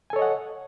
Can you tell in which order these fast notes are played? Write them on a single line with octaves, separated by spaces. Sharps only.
G#5 A4 C#5 D#5 F#5